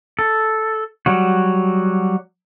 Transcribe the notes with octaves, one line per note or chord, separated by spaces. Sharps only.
A4
F#3 G3 F#4